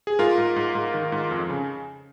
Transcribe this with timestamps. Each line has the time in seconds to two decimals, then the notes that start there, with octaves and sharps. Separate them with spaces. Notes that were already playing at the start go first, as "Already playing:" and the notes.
0.07 G#4
0.19 G#2 F4 A#4
0.38 G#2
0.56 G#2
0.75 G#2
0.94 D#3
1.12 G#2
1.31 F2
1.50 C#3